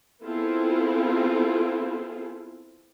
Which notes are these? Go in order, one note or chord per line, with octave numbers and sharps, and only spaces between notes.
B3 C4 E4 F4 G#4 A4